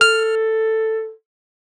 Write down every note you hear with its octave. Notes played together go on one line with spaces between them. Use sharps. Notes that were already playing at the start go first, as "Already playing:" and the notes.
A4 F6